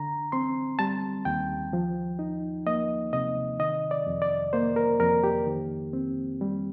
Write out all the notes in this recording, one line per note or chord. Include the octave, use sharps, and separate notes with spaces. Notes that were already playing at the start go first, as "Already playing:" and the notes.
Already playing: D3 A#5
C4 C6
G3 A5
D#2 G5
F3
D#4
A#3 D#5
C3 D#5
D#3 D#5
D5
F2
D5
A#3 C5
A#4
F2 A#4
G4
D#3
C4
G3